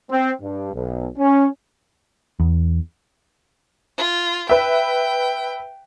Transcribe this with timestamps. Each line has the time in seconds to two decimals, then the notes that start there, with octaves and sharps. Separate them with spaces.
0.11 C4
0.42 G2
0.73 B1
1.18 C#4
2.40 E2
3.98 F4
4.49 B4 E5 G5